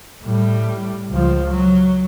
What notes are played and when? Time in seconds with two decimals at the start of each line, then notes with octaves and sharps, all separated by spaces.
0.23 A2 G3
1.10 C#2 F3
1.51 F#3